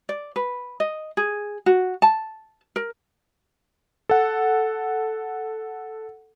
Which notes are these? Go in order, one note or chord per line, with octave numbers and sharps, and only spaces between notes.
D5
B4
D#5
G#4
F#4
A5
A#4
A4 F#5